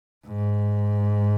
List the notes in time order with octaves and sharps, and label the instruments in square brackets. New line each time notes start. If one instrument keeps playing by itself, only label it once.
[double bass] G#2